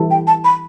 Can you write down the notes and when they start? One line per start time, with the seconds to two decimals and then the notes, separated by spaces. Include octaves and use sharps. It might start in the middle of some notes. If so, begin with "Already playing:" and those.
Already playing: E3 G3 E4 A4
0.11 G5
0.27 A5
0.44 B5